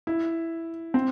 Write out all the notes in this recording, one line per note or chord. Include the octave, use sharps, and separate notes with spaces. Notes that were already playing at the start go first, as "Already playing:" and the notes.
E4
C4